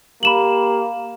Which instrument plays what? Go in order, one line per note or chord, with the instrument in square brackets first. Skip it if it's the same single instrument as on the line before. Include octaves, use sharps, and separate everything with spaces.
[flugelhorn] A#3 [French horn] G4 [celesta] B5 E7 F#7